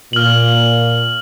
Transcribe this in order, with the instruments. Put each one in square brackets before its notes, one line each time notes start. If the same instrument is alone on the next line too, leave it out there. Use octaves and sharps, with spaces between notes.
[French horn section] A#2 [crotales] F6 F#7